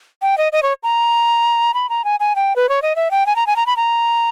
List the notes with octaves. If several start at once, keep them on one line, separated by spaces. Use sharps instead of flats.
G5
D#5
D#5
C#5
A#5
B5
A#5
G#5
G#5
G5
B4
C#5
D#5
E5
G5
G#5
A#5
G#5
A#5
B5
A#5